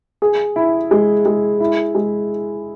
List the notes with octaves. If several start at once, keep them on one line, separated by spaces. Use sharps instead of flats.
G#4
E4
G#3
G#3
E4
G#3